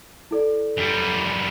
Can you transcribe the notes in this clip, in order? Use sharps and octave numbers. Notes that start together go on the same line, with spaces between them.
E4 A4 D5
F#2 G3